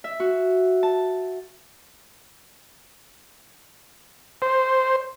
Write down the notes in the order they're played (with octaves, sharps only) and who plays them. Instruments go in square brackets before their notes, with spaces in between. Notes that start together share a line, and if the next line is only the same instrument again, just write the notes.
[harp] E5
F#4
A5
[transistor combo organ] C5